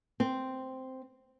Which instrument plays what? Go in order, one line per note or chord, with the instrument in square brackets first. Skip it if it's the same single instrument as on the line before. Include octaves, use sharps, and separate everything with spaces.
[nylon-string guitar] C4